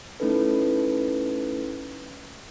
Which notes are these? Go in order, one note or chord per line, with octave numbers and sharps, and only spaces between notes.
A3 C#4 D#4 E4 A4 B4